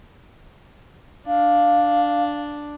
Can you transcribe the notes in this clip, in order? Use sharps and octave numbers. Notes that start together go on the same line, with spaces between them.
D4 F5